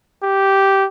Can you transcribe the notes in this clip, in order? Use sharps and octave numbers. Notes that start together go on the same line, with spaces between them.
G4